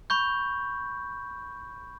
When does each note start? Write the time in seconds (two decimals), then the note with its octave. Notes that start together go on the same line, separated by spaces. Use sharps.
0.10 B5 C#6 G6